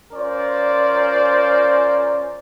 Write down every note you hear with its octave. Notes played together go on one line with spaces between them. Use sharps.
C#4 F4 A#4 C5 D5